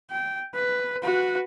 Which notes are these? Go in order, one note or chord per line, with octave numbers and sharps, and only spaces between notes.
G5
B4
F#4 B4